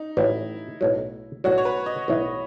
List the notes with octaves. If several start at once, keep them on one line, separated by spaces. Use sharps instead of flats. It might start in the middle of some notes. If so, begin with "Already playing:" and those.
Already playing: D#4
A1 A2 F#3 E4
B1 A2 F#3
B1 A2 F#3 F#4
C#5
B4
D#5
B1 A2 E3